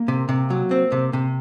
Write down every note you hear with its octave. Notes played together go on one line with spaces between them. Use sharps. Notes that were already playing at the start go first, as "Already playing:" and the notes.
Already playing: A#3
C3
C3
F#3
C4
C3
C3